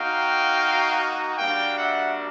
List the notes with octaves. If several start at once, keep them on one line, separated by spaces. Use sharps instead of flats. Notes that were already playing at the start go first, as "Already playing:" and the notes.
Already playing: A#3 D#4 F#4 F5 G5
G3 A#3 D4 F#4 F5 G5
E5 F#5